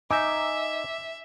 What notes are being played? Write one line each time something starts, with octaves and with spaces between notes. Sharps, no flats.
D#4 E5 G#5 D6 E6